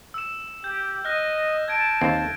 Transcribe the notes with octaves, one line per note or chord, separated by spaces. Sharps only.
E6 E7
G4 G6
D#5 F6 F#6 A#6
A5 G#6 D7
D#2 C4